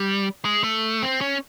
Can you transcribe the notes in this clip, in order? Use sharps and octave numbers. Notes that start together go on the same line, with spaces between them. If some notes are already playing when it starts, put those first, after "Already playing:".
Already playing: G3
G#3
A3
C4
C#4